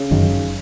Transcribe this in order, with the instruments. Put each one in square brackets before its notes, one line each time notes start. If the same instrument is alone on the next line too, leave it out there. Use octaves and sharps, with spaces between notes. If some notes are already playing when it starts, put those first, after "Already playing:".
Already playing: [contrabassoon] C#3
[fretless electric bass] G1 F#2 D#3